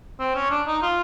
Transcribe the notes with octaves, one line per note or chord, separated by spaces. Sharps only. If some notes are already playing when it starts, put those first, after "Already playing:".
C4
C#4
D4
D#4
F4